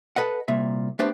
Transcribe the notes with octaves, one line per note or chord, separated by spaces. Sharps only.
A4 B4 D#5 F#5
C2 A#2 E5
A3 B3 D4 G4 B4 C5